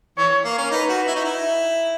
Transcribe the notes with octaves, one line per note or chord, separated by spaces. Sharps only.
E3 C#5
A#3
C#4
D#4 B4
F#4
E4
D#4
E4